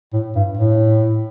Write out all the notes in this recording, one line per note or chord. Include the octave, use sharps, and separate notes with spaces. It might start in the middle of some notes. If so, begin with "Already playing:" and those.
A2
G2
A2